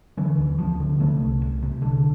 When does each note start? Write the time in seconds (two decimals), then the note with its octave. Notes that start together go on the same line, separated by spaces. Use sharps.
0.17 D3 E3
0.38 D2
0.58 D2 F3
0.80 D3
1.00 C3 A3
1.21 C2
1.42 C2
1.62 C3
1.82 D3